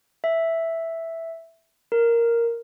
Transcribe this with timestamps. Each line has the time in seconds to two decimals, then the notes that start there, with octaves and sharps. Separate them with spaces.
0.24 E5
1.92 A#4